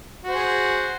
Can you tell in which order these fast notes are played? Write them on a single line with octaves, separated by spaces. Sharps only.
F#4 C5 G#4